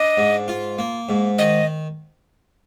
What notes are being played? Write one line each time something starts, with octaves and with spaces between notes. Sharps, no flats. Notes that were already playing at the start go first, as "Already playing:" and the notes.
Already playing: D4 D#5
G#2
F4
A#3
G#2
D#3 D#5